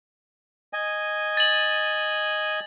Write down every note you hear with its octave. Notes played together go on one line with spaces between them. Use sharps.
D#5 G#5
A6 F#7